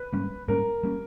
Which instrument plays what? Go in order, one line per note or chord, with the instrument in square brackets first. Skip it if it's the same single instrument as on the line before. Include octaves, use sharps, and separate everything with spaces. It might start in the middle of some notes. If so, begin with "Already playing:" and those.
Already playing: [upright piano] B4
[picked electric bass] G#2 G3 A#3 C#4
[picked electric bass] G#2 G3 A#3 C#4 [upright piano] A#4
[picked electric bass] G3 A#3 C#4